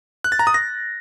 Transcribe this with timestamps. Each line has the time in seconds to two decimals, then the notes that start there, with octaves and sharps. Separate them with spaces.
0.24 F#6
0.32 A6
0.39 A#5
0.47 D#6
0.54 A#6